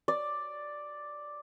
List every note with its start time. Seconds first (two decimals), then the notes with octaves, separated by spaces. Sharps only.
0.08 D5